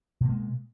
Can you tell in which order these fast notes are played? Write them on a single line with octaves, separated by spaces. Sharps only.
B2 A#3 G#3